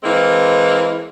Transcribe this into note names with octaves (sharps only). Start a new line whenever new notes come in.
E3 G#3 A#3 C4